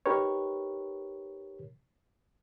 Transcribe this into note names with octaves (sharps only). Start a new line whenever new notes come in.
D#4 G4 A#4 B4 C#5